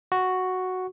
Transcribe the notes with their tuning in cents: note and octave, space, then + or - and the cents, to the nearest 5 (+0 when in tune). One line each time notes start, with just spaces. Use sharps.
F#4 +0 C#6 +0